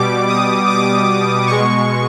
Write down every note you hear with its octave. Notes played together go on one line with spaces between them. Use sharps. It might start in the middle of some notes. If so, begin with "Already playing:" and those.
Already playing: B2 G3 D6
D#6
D6
B2 G#3 C#6